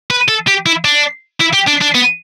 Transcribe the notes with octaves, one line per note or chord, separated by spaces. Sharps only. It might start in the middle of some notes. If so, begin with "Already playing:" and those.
B4
A4
G4
E4
D4
E4
G4
D4
D4
B3